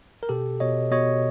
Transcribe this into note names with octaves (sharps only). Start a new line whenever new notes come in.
A#4
B2 G4 A4
B2 C#5 D#5
B2 C#5 D#5